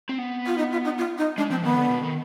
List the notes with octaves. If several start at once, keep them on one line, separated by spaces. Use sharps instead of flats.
C4
B3
F4
D#4
F4
D#4
F4
D#4
G#3 D4
F3 C4
D#3 B3
D3
B2
D#3